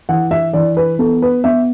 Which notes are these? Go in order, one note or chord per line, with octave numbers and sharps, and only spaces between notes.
E3 F#5
E5
E3 D5
B4
B3 A4
B4
B3 E5